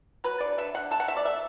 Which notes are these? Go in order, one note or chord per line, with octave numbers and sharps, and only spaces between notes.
F#3 B4
D3 D5
D3 E5
D3 F#5
A3 A5
F#5
B2 E5
D5
A3 E5